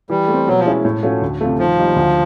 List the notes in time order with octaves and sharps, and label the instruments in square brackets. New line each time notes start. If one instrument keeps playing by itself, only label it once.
[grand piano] E3 [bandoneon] G3
[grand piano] A3
C4
[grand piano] B2 [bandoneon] F#3
[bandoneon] F3
[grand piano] G#3 C#4 E4
A2
F3 A3 C#4 F#4
D2
C3 F3 A3
[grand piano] D#3 [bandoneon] F3
[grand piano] G3 A#3 D#4
D2